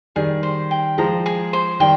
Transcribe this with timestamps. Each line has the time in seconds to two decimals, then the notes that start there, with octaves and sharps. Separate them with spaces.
0.16 D#3 G3 G#4
0.43 C5
0.71 G5
0.98 F3 G#3 A#5
1.26 G#4
1.53 C5
1.80 D#3 G3 G5